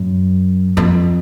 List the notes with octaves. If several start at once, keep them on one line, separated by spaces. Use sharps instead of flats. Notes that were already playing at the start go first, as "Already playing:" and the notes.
Already playing: F#2
F2